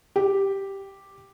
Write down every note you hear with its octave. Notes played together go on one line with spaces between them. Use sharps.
G4